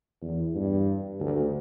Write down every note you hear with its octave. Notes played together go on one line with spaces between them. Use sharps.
E2
G2
D2